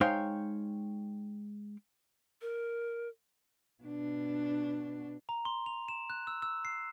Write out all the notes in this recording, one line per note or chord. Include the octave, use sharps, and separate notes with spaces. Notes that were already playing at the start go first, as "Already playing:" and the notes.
G#3 D#4 C5 C#5 F5 G5
A#4
B2 D4
A#5
C6
F7
E7
F#6
E6
E6
C7